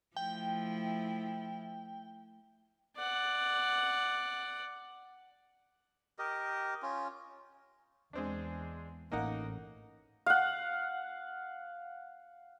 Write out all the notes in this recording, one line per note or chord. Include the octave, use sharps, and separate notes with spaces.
F3 A3 E4 G5
D5 F#5
G4 A#4 D#5
C#4 F4
E2 G#3 C4 D4
A1 A#3 D#4 F#5
F5 F#5